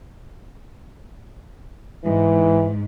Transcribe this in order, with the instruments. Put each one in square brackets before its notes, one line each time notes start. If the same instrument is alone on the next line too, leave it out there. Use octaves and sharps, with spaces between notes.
[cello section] G#2 [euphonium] E3